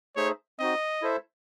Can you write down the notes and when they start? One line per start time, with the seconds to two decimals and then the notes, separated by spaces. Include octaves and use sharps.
0.16 A3 D#4 G#4 C5 C#5 E5
0.59 C4 D#4 F#4 D#5
1.02 E4 A4 C5 E5